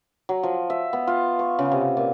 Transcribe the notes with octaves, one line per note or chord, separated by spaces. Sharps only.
F#3
F3
E5
B3
F4
C#6
C#3
C3
A#2